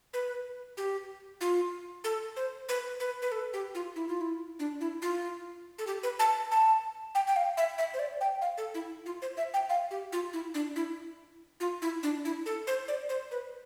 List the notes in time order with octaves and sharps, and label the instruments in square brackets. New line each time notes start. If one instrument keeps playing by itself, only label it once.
[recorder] B4
G4
F4
A4
C5
B4
B4
B4
A4
G4
F4
E4
F4
E4
D4
E4
F4
A4
G4
B4
A5
A5
G5
G5
F5
E5
E5
C5
D5
G5
F5
A4
E4
F4
C5
E5
G5
F5
G4
F4
E4
D4
E4
F4
E4
D4
E4
A4
C5
D5
C5
B4